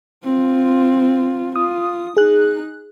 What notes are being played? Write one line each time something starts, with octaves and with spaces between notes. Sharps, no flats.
C4 F4
F4 D#6
D#4 G#4 F#6